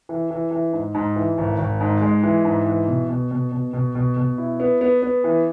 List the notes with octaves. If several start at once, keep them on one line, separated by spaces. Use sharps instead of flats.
E3
E3
E3
G#2
G#2
E3
G#1
G#1
G#2
G#3
E3
G#2
E3
B2
B2
B2
B2
B2
B2
B2
E4
B3
B3
B3
E3